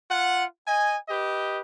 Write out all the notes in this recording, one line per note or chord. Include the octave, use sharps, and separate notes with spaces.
F4 F#5
D#5 G#5
G4 B4 D#5